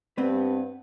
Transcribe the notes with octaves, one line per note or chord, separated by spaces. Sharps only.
G2 B3 C4 B4